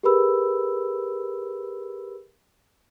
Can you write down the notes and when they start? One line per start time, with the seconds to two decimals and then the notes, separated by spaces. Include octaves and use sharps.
0.03 G4 G#4 A#4 B4 B5 E6